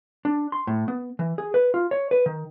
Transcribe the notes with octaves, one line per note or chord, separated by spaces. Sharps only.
D4
C6
A2
B3
E3
G#4
B4
F4
C#5
B4
D#3